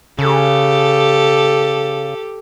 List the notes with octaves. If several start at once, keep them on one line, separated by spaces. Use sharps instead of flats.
C#3 G4 A4